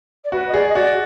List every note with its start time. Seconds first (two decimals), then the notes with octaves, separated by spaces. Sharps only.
0.24 D5
0.32 F#4 B4
0.48 D#5
0.53 G#4 D5
0.69 D#5
0.75 F#4 D5